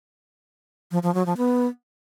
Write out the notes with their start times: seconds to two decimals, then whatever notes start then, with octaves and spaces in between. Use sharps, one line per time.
0.92 F3
1.03 F3
1.14 F#3
1.26 F3
1.37 B3